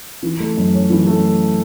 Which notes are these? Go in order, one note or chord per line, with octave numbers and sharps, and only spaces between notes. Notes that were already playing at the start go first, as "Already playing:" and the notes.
E3
A3
F#2
C#4
E3
A3